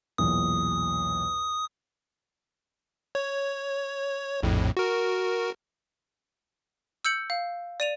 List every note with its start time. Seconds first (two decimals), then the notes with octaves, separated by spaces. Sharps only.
0.18 B1 E2 A#2 D#6
3.15 C#5
4.43 A#1 F2 A2
4.77 F#4 A#4
7.05 E6 G6 C#7 F#7
7.30 F5
7.80 D5 D#7 F7